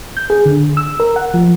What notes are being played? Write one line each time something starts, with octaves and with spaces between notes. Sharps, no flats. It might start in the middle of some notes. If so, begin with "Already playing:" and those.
G6
G#4
D3
E6
A#4
F#5
F3